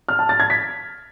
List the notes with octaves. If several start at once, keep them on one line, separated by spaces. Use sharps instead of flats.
F6
A5
A6
G#6
B6